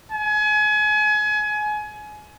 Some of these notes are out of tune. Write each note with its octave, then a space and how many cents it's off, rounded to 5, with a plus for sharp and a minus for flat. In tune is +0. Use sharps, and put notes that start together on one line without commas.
G#5 +30